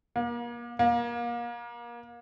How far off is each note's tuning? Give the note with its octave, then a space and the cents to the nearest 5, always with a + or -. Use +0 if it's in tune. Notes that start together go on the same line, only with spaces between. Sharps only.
A#3 +35
A#3 +30